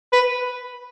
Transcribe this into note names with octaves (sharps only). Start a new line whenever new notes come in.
B4